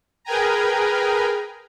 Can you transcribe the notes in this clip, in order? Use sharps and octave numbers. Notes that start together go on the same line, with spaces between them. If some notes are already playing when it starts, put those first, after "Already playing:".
G#4 A#4 B4 G5 G#5 A#5